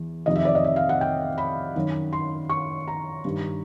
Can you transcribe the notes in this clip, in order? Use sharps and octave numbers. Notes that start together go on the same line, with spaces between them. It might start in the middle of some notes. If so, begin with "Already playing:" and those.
Already playing: E2 E3
F2 C3 D#3 D#5
E5
D5
D#5
E5
F5
F#5
G5
B5
F#2 D#3
C6
C#6
A#5
G2 D#3